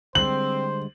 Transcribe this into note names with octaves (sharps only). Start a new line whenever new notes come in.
D3 G3 G#3 C4 C5 F#7